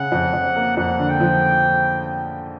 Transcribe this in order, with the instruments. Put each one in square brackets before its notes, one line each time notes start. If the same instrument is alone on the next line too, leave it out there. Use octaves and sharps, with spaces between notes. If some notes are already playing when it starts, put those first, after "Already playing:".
Already playing: [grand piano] C#3 [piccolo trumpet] F#5
[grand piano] F2
F2
A#3
[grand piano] F2 [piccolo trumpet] F#5
[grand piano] D3
[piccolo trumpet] G5
[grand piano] F3